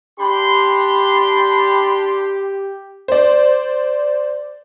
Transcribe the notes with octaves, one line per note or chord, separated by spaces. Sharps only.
D4 G4 B5 C6
C5 D5